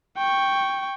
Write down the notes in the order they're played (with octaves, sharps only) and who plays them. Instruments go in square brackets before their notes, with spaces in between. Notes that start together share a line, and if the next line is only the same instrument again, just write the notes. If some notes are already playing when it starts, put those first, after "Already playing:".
[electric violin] G5 C#6